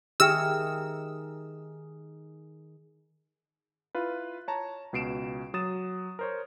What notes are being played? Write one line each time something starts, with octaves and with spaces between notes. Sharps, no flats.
D#3 D#4 G4 G#4 E5 G5 E6 F6
E4 F4 B4
C#5 A5 A#5
C#2 B2 C7 D7 E7
F#3 D#6 A6 E7
A#4 C5 C#5